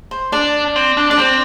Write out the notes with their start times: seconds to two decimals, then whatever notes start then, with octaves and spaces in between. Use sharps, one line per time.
0.11 C5
0.32 D4 D5
0.76 C4
0.97 D4
1.10 D4 D5
1.19 C4 C5